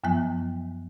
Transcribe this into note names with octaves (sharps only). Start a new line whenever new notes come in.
F#2 F3 F#3 B3 G#5